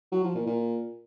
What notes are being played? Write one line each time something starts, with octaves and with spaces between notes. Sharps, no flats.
F#3
F3
A#2
A#2